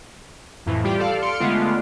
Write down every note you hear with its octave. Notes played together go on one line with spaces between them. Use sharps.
F2 A2 E3
G3 F4 G4
A4 D5 F5
C6 F6 C#7 D7
D3 G#3 A3 B3 F4